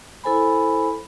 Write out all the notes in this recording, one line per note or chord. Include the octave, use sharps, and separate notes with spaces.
E4 A4 C5 G#5 B5